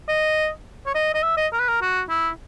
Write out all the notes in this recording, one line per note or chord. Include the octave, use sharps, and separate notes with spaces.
D#5
C#5
D#5
D#5
E5
D#5
A#4
B4
A#4
F#4
E4